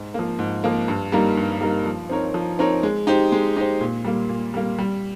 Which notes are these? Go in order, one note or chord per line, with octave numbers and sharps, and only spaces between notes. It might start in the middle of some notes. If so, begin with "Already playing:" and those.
Already playing: G#2
F3 A#3
G#2
F3 A#3
G2
G3 A#3 D#4 A#4
G2
G3 A#3 D#4 A#4
F3
C4 D#4 A#4 C#5
F3
C4 D#4 A#4 C#5
G#3
D#4 G4 C5
G#3
D#4 G4 C5
A#2
G3 A#3
A#2
G3 A#3
G3